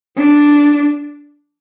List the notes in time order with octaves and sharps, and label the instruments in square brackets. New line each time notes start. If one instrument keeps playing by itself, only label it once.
[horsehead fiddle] D4